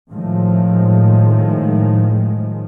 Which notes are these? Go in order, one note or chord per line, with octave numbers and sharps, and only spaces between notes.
A2 D#3 F3 G#3